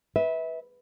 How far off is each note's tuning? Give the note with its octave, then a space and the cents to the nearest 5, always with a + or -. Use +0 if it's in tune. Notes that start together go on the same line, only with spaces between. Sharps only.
B4 -5 E5 -30